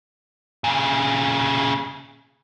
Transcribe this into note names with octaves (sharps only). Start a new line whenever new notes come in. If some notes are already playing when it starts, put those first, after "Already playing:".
A#2 C#3